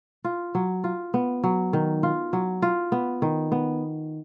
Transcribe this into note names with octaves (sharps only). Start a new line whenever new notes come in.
F4
F#3
F4
B3
F#3
D#3
F4
F#3
F4
B3
D#3
B3